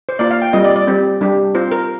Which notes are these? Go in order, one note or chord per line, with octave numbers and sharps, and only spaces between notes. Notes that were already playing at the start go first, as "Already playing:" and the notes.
C5
A#3 F4 D5
F5
G5
G3 C4 F4 D#5
D5
D5
G3 C4 G4
G3 D4 G4
C4 F4 C5
A#4